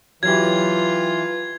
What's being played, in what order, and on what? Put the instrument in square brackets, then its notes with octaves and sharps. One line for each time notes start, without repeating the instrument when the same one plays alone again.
[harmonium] E3 [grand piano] F#3 G4 [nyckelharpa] F4 [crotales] G#6